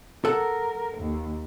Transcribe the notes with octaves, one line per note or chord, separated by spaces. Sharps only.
A4 A#4 F#5
D#2